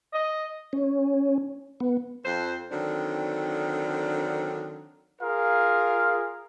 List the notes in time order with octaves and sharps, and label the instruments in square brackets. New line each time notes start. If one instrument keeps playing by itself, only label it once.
[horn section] D#5
[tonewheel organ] C#4
B3
[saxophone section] F2 C5
D3 D#3 F#3 C4 D4
[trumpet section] F4 G#4 A#4 F5